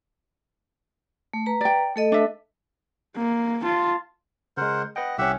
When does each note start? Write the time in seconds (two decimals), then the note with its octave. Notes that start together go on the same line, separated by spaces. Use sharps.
1.33 A3
1.46 B4 A#5
1.61 D5 G5
1.96 A3 A4 D#5
2.12 D4 E5
3.16 A#3
3.62 F4 A5
4.57 C#3 G#3 A#4 C5 F#5
4.96 B4 D#5 F#5 G5
5.18 C2 C#4 G4 E5 F#5